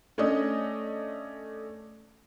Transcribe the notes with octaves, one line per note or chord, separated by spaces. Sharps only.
A3 C#4 D4 D#5